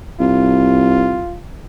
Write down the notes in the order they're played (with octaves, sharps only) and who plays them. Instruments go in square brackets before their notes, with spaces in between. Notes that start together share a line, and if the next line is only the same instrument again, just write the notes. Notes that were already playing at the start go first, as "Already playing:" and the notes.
[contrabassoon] C2 [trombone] F4